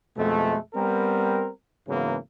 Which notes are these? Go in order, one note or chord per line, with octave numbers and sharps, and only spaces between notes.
F2 B2 G#3 A3
G3 B3 C4 A#4
G#2 C#3 E3 F#3 A#3 B3